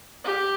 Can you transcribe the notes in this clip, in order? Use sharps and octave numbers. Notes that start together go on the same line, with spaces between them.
G4